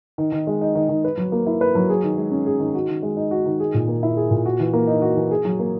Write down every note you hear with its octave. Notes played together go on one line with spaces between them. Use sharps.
D#3
D#3
G#3
D#4
D#3
D#3
B4
F#3
A#3
E4
B4
F#3
G#4
D#3
G#3
C#4
G#4
D#3
F#4
D#3
G#3
D#4
F#4
D#3
G#4
A#2
A#3
E4
G#4
A#2
F#4
E3
A#3
D#4
F#4
E3
G#4
F#3
A#3